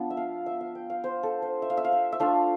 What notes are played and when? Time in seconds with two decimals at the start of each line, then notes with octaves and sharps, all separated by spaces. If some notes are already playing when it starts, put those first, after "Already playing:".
Already playing: F3 B3 D4 F4
0.10 E5
0.17 F5
0.46 E5
0.61 F5
0.75 G5
0.90 F5
1.04 C5
1.23 A4
1.42 C5
1.62 E5
1.70 F5
1.77 E5
1.84 F5
1.92 E5
2.12 E5
2.20 A3 D4 F4 F5